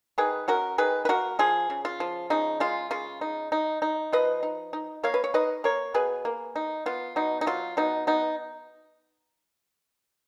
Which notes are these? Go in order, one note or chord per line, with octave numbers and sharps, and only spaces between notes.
D#3 G#4 B4
C#4 F#4 A#4
D#3 G#4 B4
B4
A#3 F#4 A#4
F3 F4 G#4
C#3
F4
F3
C#3 D#4
G#3 F4
C#3 F4
D#4
D#4
D#4
F3 B4 D#5
D#4
D#4
A#3 C#5 F5
B4
C#5
D#4 B4 D#5
A#3 A#4 C#5
B2 G#4 B4
A#3
D#4
B3 F4
B2 D#4
D#4
F#3 F4
B2 D#4
B3 D#4